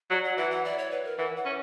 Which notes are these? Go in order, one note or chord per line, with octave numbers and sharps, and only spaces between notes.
F#3 D5
F#5
E3 F#5
F#5
D5
C#5
B4
A#4
E3 F#5
F#5
C#4